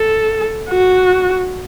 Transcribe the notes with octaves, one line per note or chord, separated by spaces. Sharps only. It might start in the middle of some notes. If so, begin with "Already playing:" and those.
Already playing: A4
F#4